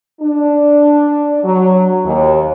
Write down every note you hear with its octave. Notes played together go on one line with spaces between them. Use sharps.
D4
F#3
D#2